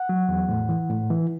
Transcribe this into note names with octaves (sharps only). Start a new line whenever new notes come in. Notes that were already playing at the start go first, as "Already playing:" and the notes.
Already playing: F#5
F#3
E2
A2
E3
A2
E3